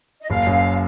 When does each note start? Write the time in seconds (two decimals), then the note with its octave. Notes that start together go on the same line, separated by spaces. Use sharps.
0.21 D#5
0.30 F#1 F5
0.47 F#2